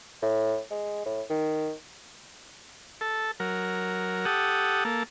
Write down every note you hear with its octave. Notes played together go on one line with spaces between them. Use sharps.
A2
G#3
A2
D#3
A4
F#3 A#4
G4 A4 F#5 D#6
A#3 A4